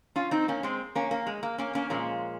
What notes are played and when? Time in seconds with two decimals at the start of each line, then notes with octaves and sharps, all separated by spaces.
0.16 C#4 F4
0.31 C4 D#4
0.48 A#3 C#4
0.63 G#3 C4
0.95 A#3 C#4
1.11 A#3
1.27 G#3
1.43 A#3
1.58 A#3 C#4
1.75 A#3 C#4
1.90 A#2 F3 G#3 A#3 C#4